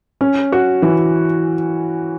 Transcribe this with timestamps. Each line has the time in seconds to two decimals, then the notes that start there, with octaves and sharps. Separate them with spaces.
0.21 C#4
0.52 F#4
0.82 E3